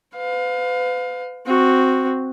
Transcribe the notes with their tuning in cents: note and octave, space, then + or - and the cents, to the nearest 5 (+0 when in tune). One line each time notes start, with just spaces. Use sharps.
B4 +40 F5 +25
C4 +0 F#4 -5